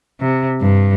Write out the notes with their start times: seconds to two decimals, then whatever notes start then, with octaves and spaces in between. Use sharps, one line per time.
0.21 C3
0.61 G2